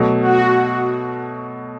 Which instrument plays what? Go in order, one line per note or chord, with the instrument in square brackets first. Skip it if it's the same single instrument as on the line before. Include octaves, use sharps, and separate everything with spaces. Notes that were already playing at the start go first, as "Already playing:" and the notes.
Already playing: [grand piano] B2 F#3 A3
[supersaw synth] F#4